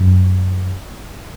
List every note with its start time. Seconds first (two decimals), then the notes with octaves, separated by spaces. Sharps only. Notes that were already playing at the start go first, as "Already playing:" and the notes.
Already playing: F#2